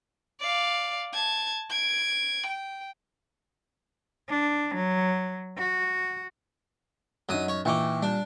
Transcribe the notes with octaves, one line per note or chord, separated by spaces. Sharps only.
D5 F5
A5 G#6
G#6 D7
G5
D4
F#3
F#4
F#2 F#3 D#4 D#6
C#5
A#2 E3 D#4 G5 C#6 D6
G3 D4